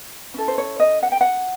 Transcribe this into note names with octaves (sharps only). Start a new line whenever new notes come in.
C#4 E4 A4
C5
C#5
D#5
F#5
G5
F#5